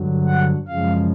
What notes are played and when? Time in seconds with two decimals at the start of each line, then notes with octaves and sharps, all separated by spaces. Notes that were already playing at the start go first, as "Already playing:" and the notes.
Already playing: G2 D3 F#3
0.26 F#5
0.68 F#2 C#3 F3 G#3 F5